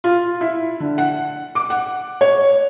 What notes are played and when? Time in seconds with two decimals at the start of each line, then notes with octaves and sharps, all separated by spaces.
0.04 F4
0.41 E4
0.80 D3
0.98 F#5
1.55 D6
1.70 F#5
2.21 C#5